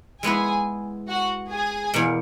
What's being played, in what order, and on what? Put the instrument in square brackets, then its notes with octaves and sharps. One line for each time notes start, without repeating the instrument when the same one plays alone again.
[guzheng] G#3 B3 E4 B4 [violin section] G#4 G#5
[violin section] F#4 F#5
G#4 G#5
[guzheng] E2 B2 A#3